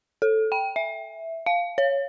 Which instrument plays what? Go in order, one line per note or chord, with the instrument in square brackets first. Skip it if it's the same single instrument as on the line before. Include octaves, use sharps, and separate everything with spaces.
[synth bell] A4
G5
E5
F5
C#5